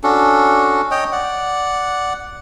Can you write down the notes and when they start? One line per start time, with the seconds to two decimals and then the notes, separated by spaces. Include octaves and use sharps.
0.03 C#4 D4 F#4 A4
0.91 C#5 D#5 G5
1.12 D5 F#5